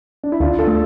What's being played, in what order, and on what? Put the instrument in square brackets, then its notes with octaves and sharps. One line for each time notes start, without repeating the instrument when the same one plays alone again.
[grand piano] D4
E4
[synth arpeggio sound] D2 [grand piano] D4 F4
[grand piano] F4 A4
[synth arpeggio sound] A3